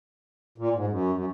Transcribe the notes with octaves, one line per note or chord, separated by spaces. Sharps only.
A#2
G#2
F#2
F#2